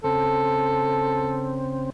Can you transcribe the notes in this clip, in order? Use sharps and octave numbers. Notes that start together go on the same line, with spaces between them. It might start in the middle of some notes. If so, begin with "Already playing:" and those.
C#3 C4 A4